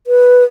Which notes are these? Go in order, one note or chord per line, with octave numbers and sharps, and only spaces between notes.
B4